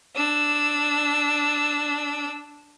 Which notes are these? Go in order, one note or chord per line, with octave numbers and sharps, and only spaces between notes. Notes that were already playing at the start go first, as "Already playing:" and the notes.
D4 E6